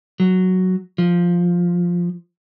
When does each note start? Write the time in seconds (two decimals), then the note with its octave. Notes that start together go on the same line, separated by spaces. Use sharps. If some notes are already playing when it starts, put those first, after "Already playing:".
0.20 F#3
0.98 F3